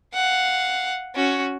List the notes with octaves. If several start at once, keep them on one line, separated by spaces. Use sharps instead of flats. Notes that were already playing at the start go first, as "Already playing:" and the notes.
F5 F#5
C#4 F#4